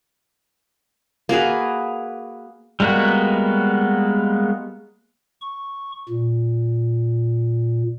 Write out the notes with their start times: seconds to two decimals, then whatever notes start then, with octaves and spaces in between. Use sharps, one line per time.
1.29 A#3 F#4 G#4 B4
2.80 G3 G#3 A#3 B3 F#4
5.41 C#6
6.09 A#2